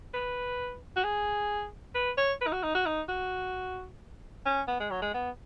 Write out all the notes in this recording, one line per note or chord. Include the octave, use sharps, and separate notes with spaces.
B4
F#4
G#4
B4
C#5
B4
D#4
F#4
D#4
F#4
D#4
F#4
C#4
B3
G#3
F#3
G#3
B3